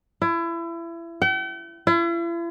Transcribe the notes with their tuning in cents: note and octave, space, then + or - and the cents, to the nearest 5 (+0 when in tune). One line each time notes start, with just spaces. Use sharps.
E4 +30
G5 -45
E4 +45